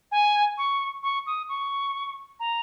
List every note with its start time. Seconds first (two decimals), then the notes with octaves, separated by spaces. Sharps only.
0.11 G#5
0.57 C#6
1.03 C#6
1.26 D#6
1.49 C#6
2.39 A#5